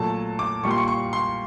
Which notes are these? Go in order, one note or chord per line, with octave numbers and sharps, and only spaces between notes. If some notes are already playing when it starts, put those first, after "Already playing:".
Already playing: A#2 F#3 A3 A5
D6
A#2 G3 A#3 C#6
C6
C#6
C#6
C6